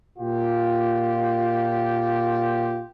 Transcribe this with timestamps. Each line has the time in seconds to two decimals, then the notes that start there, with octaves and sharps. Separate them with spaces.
0.18 A#2 F4 G4